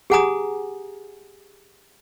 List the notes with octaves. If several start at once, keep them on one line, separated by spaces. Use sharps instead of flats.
G4 G#4 F#5 G#5 A#5 D#6